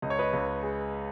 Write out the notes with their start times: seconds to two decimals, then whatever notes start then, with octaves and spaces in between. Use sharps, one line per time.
0.02 C#2 D#5
0.10 C#5
0.19 B4 D#5
0.33 C#2
0.63 G#3